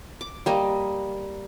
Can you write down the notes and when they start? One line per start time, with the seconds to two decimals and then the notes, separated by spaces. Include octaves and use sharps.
0.21 D6
0.46 G3 A#3 D#5